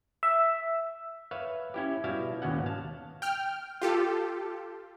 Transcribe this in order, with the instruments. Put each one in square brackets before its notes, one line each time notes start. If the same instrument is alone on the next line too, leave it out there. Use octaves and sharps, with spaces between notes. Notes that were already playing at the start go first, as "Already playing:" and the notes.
[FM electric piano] E5
[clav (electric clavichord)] B4 C#5 E5 F5
C#4 E4 G4
B2 G3 E4 F5
G#1 D#2 B2 C#4 F#5
F5 A5
[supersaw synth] G5 F6
F4 G4 A4